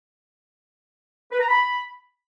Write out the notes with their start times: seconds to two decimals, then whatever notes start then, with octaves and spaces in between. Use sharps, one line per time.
1.31 B4
1.40 A#5
1.48 B5